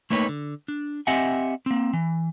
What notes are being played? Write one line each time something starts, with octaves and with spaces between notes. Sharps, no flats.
A3 A#3 D#4 B4 C#5
D3
D4
C4 G4 D#5 E5 F#5 G#5
A#3 C4
E3